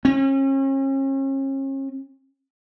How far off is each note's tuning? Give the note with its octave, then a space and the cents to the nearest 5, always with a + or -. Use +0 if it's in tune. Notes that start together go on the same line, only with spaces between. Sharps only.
C#4 -40